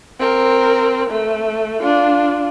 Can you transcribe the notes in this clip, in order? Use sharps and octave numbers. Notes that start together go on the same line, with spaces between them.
C4 A#4
A3
D4 F4